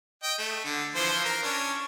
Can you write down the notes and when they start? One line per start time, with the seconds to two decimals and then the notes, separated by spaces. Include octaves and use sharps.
0.23 D#5 G5
0.38 A3
0.65 D3
0.95 E3 F3 C5
1.25 A#4
1.43 C#4 D4